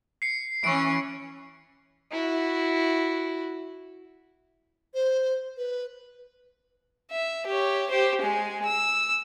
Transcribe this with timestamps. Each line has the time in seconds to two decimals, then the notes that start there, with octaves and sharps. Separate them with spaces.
0.22 C7 C#7
0.64 E3 C#4 C#6 D7
2.11 E4 F#4
4.94 C5
5.57 B4
7.12 E5
7.47 G4 C#5
7.89 G4 C5
8.22 G#3 G#5
8.65 E6